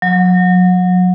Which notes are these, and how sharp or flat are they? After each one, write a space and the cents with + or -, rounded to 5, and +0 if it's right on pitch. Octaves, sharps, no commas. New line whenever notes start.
F#3 -30